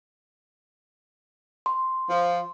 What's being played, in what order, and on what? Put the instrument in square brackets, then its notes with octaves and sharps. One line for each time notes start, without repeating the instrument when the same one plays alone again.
[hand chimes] C6
[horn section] F3